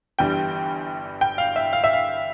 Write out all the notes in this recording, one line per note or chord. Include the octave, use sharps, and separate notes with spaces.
G1 G2 E3 G3 G5
G5
F5
E5
F5
E5
F5